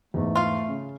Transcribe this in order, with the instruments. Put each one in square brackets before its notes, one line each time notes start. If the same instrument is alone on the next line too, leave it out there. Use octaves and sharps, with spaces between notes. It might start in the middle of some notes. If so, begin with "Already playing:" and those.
[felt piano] E2 G#2 [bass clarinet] A3
[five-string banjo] F4 F5
[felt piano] C#3